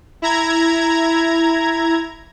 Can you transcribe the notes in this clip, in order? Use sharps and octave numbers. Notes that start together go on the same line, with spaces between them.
E4 A#5 G#6